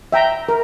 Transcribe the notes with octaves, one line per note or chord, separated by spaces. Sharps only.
E5 G5 A#5
A#4